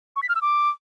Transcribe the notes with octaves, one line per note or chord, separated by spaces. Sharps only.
C#6
B6
F6
E6
D6